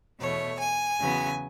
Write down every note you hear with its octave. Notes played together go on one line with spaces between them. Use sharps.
E2 B2 A3 C#5
G#5
E2 C#3 F#3 B3